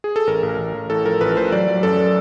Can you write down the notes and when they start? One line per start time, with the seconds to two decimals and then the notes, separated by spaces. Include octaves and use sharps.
0.04 G#4
0.16 A4
0.27 A1 A#4
0.43 A1
0.59 A1
0.74 A1
0.90 A2 A4
1.05 F3 A#4
1.21 A1 B4
1.37 A1 C5
1.52 F#3 D5
1.68 F#3
1.83 F#2 A4